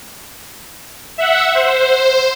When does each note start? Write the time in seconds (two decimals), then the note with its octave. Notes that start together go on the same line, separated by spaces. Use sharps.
1.18 E5 F#5
1.55 C5